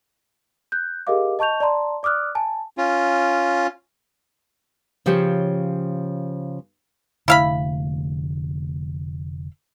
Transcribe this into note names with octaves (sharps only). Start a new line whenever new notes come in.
F#6 G6
G4 G#4 A#4 D#5 F5 D6
D#5 A5 C#6 G6 F7
D5 A5 A#5 C6
D5 D6 D#6 F6 F#6
G#5 A5
C#4 F4
C#3 F3 G4 C5 C#5
F1 D3 A3 E4 F5 B5